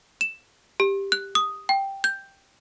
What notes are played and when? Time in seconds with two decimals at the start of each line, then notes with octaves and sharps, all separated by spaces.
0.21 E7
0.80 G4
1.12 F#6
1.35 D#6
1.69 G5
2.04 G6